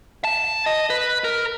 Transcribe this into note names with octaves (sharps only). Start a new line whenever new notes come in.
A5
D#5
B4
A#4